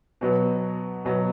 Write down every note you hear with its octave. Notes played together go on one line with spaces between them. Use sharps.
B2 F#3 B3
B2 F#3 B3